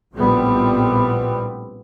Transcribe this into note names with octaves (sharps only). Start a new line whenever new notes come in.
A#1 A2 F3 G3 B3 C4